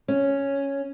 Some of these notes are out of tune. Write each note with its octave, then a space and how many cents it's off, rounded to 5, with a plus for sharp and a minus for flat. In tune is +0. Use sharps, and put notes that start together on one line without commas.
C#4 +0